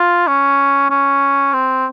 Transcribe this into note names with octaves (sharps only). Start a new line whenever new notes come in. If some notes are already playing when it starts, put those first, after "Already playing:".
Already playing: F4
C#4
C#4
C4